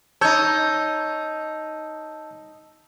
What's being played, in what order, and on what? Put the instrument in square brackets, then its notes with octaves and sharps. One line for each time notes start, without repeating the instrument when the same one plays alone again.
[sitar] D#4 C#5 [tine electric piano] A5 E6 G6